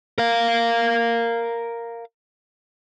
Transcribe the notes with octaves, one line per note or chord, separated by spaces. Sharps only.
A#4 F5